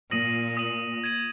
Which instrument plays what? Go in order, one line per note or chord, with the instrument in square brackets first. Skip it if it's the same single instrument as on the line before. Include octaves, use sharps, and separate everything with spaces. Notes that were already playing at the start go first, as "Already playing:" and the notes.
[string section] A#2 [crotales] D#6 A#6 D#7 F#7
[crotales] D#6 A#6 D#7 F#7
G#6 D#7 F#7